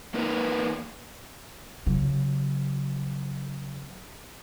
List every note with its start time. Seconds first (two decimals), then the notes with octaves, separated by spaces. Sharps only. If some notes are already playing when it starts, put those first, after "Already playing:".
0.14 E2 A#3 D#4 A#4 B4
1.86 C#3 F#3